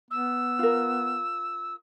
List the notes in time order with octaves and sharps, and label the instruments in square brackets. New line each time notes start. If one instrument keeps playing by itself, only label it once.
[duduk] B3 [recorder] E6
[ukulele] F4 A#4